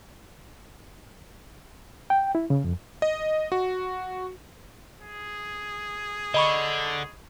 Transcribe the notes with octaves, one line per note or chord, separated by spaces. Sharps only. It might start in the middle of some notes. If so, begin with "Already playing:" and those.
G5
E4
C#3
F2
D#5
F#4
G#4
D3 D#5 B5 C#6